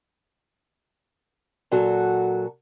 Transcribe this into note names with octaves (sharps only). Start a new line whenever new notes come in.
A#2 F#3 F#4 A4